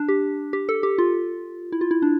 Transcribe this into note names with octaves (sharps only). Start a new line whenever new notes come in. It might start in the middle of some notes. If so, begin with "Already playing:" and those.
Already playing: D4
G4
G4
A4
G4
F4
E4
F4
E4
D4